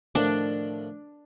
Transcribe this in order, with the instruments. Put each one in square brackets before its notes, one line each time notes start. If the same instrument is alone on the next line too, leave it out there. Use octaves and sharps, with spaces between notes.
[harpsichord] A2 D#3 F3 [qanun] D4